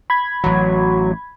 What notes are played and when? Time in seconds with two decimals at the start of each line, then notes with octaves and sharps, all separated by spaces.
0.10 B5 G#6
0.44 A1 E3 F#3